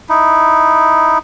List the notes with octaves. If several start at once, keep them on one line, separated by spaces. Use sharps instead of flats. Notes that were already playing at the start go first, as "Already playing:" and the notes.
D#4 E4